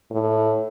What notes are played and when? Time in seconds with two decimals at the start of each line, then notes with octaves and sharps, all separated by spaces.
0.11 A2